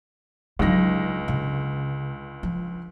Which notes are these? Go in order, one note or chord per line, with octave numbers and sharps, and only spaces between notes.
C#2 D3 F#3 D#4 A#6
C#3
F3